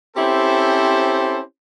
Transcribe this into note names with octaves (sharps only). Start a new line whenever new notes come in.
C4 C#4 E4 G4 A4 C5